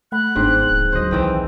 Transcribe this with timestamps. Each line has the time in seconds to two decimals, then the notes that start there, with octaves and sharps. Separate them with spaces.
0.12 A3 F#5 B5 F#6
0.36 G1 G#2 B3 C4 D4 C6
0.70 D1
0.92 D2 D3 F#3 C5 D#5
1.11 B1 D#3 E3 C4